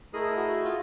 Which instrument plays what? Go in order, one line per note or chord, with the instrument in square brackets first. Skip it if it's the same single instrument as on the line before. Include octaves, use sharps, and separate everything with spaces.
[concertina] A3 E4 D#5 [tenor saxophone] G#4 [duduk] A#4
[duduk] F#4
[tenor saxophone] F4